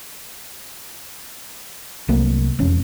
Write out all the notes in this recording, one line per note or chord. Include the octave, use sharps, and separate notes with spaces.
C2 F#3 A3 A#3
E1 F2 C#4